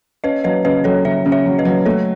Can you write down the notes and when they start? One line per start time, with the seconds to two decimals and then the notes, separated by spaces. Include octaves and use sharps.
0.24 C#4 B4 D#5
0.44 F#3 B4 D#5
0.65 C#3 B4 D#5
0.84 F#3 A4 C#5
1.05 C#3 C#5 E5
1.26 C#3
1.32 C#5 E5
1.46 F#3
1.58 B4 D#5
1.65 F#3
1.85 A3 A4 C#5